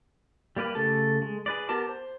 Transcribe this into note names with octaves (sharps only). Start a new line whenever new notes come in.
G3 A#3 G4 B4
C#3 A3 G4 A4 A5
G#3
G#4 B4 D5
B3 G4 A#4 A5 D6
C5